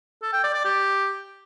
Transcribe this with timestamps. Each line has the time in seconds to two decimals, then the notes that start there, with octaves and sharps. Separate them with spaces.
0.23 A4
0.33 G5
0.44 D5
0.54 D5
0.65 G4